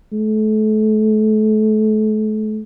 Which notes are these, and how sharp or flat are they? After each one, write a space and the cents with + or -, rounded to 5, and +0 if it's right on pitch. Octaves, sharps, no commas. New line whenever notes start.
A3 -35